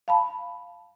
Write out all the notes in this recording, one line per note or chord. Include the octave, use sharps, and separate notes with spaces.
F5 A5 B5